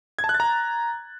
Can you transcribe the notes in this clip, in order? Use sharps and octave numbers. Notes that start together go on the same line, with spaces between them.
G#6
A5
F#6
A6
A#5